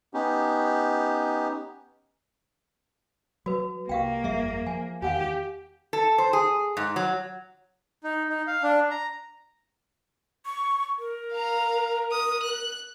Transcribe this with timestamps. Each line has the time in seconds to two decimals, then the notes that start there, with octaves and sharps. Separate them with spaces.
0.14 B3 C#4 D#4 G4
3.46 F#3 F#4 B4
3.89 C2 A#3 G4 F5 G5
4.24 G1 F2 G3 G#4 E5
4.67 F3 G#5
5.02 E2 D#3 G4 F5 F#5 G#5
5.93 A4
6.18 C5
6.33 G#4
6.77 G#2
6.96 F#3
8.04 D#4
8.29 D#4
8.47 F5
8.63 D4
8.91 A#5
10.46 C#6
10.99 A#4
11.33 F5 A#5
12.12 D#6
12.43 F#6